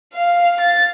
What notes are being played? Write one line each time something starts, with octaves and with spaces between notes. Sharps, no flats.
F5
A6